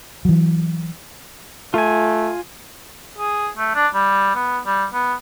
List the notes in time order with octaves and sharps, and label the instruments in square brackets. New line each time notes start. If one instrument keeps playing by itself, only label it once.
[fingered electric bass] E3 F#3
[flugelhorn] A3 [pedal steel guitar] F4 G#5
[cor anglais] G#4
A3
D4
G3
B3
G3
B3